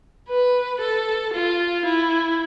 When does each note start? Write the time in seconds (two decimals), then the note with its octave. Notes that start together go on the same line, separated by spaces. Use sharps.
0.29 B4
0.80 A4
1.33 F4
1.85 E4